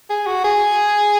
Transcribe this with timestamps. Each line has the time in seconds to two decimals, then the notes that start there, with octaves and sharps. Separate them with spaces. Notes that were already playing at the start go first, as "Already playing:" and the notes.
0.10 G#4
0.27 F#4
0.44 G#4